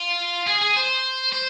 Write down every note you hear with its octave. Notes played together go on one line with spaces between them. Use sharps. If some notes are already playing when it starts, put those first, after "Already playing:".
Already playing: F4
G#4
G#4
C5
C5